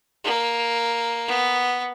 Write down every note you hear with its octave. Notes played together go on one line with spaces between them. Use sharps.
A#3
B3